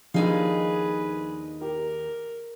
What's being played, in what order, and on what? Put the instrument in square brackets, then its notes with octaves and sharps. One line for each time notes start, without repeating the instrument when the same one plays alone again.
[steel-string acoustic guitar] D#2 D#4 F5 [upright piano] F3 G3 D4 [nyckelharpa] G#4 B4
[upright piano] G4 [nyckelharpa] A#4